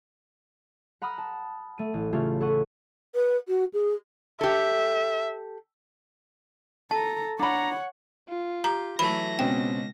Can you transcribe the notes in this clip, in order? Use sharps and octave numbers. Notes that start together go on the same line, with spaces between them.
F#5 A#5 B5 D#6 F6
A5
A3 D#7
A1
C#3 A3 C#4 F4 G4
A4 C#5 F#5 C#6 D#7
B4
F#4
G#4
G4 A4 E5
A4 A5 A#5
D4 C#5 F#5 A#5 B5
F4
G4 A#5
E3 F#3 A3 B5 A#6
C#2 B2 C4 C#4 G5